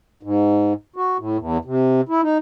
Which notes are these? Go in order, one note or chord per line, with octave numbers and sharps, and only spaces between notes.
G#2
F#4
A2
E2
C3
E4
D#4